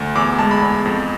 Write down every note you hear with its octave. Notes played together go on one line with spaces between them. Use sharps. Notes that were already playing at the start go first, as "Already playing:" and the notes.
Already playing: D2
E2 D6
G#3 A5
B5
E2
F2